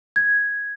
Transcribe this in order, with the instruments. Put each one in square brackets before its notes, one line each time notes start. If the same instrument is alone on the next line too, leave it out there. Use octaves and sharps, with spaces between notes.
[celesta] G#6